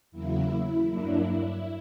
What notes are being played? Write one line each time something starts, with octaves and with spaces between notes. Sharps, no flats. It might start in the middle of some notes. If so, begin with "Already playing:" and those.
E2 C#3 F#3 A#3 E4
G2 F#3 A#3 D4